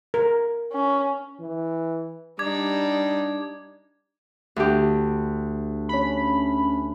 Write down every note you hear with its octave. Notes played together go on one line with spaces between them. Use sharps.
A#4
C#4
E3
G3 D4 D#4 D6 G#6
D2 G4
C#4 B5